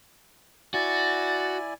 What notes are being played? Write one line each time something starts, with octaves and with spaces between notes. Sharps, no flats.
E4 F#4 D5 G#5 A6